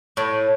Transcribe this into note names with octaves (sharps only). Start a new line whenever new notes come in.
A2